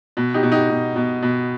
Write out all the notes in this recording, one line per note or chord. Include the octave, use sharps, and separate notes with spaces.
B2
D#4 G4
B2
D#4 G4
B2
B2
B2